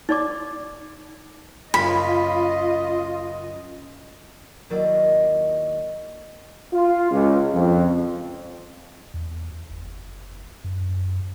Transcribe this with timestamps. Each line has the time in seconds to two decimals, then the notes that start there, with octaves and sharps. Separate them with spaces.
0.09 D#4 D5 D6
1.74 F#2 C#3 F4 D#5 B5
4.70 D#2 D#3 F#3 E4 D5 D#5
6.73 F4
7.11 C#2
7.53 F2
9.14 E2
9.70 F#1
10.64 F#2